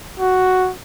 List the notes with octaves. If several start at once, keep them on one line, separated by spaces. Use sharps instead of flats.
F#4